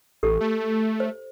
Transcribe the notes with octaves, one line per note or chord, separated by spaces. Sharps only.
A1 G4 A4
A3
C5